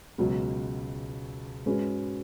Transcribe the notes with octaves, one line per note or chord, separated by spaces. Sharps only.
C#2 B2 F#3
G#2 G#3 C#4 F#4 B4